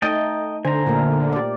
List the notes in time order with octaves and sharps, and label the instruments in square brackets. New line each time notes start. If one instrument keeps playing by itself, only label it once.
[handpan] A3 D#4 [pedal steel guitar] D#5 G5 A5
[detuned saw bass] D3 [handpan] C5 [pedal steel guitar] G#5 A#5
[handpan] A#2 A3 A#4
G4 D5